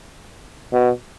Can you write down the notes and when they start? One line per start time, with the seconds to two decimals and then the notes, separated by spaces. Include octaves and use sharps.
0.72 B2